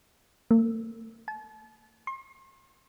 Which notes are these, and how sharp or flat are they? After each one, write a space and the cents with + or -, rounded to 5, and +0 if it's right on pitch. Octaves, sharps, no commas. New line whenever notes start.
A#3 -45
A5 -35
C6 +40